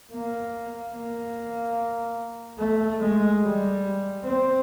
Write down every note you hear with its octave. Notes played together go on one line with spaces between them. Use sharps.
A#3
A#3
A3
G#3
G3
C4